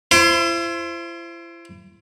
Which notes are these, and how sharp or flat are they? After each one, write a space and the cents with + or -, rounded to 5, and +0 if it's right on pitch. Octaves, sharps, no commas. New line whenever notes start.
E4 +40 C5 +0